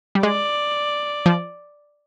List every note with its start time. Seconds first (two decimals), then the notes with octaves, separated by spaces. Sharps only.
0.15 G3
0.23 G#3 D5
1.26 F3